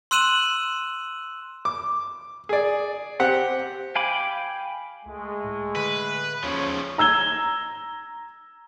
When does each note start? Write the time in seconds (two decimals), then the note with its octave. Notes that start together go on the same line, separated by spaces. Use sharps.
0.11 C6 E6 F#6 D#7 E7 F#7
1.65 D6
2.49 G#4 D5
3.19 C4 G4 F#5
3.96 F5 G5 G#5 B5 D6
5.05 C#2 G#3 A3
5.44 A2
5.76 D3 B4
6.43 D#2 C#3 F3 C#5
6.98 A#5 E6 G#6 G7